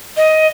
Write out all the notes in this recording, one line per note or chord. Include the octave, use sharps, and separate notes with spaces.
D#5